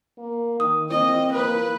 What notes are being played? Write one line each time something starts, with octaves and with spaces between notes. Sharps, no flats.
A#3
D#3 D#6
A#3 C4 D#5
A#3 B4